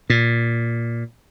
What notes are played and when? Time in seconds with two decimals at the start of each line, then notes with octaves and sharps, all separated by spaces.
0.10 A#2